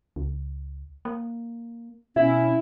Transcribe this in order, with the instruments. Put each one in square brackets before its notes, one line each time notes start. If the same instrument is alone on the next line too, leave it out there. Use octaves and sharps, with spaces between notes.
[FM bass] C#2
A#3
[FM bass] B2 [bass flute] C#4 [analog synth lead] E4